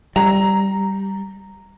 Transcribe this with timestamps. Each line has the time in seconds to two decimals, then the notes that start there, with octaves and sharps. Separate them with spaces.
0.16 G3 A#5